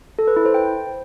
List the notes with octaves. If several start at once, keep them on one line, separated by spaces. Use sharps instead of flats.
A4
B4
E4
C5
G5